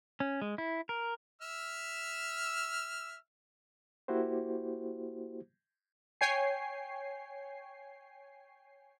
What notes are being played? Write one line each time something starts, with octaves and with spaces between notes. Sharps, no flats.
C#4
G#3
E4
A#4
E5 E6 F6
A#3 E4 F#4 G4 C5
C#5 G5 G#5 C7